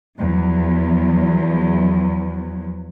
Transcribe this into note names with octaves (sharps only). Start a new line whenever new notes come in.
E2 F3 F#3